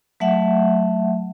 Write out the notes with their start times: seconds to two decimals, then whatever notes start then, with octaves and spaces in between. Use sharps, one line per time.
0.20 F#3 A3 E5 F#5